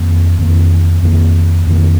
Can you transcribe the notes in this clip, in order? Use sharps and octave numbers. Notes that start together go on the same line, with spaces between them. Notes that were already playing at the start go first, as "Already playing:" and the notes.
Already playing: F2 D#3 A#3
F2 D#3 A#3
F2 D#3 A#3
F2 D#3 A#3